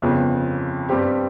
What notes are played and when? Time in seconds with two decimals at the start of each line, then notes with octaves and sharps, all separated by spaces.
0.02 G1 F2 C#3
0.89 G2 G3 C4 G4